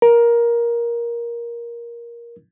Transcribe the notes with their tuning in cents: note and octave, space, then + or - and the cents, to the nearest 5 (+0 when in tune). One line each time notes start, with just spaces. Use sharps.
A#4 +15